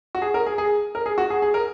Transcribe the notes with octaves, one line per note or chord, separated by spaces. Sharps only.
F#4
G#4
A#4
G#4
G#4
A#4
G#4
F#4
G#4
G#4
A#4